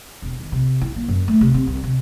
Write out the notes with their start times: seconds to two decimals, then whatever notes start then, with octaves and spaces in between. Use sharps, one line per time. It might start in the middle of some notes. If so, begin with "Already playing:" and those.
0.22 E1
0.39 D#3
0.52 C3
0.81 E4
0.96 A#3
1.08 F#2
1.28 A3
1.41 C3
1.54 C4
1.67 C2
1.84 C3